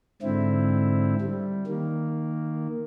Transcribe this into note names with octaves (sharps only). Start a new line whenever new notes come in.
G#2 D3 C4 E4
G3
D#3 A#3